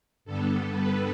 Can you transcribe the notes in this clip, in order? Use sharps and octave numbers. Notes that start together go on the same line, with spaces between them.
G2 D3 G3 B3 A4
B4